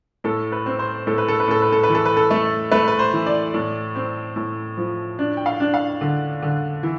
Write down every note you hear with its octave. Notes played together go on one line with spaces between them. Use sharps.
A2 A4
B4
C4
C5
A2 A4
B4
A4
B4
A2 A4
B4
A4
B4
E3
A4
B4
A4
A3
A3 B4
B4
C5
E3
D5
A2
C4
A2
F3
D4
G5
F5
D4
F5
D3
D3
E3